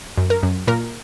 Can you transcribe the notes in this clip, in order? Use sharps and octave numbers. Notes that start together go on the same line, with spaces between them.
F#2
A#4
F#2
A#2 A#4